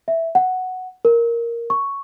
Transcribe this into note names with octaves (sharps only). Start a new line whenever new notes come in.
E5
F#5
A#4
C#6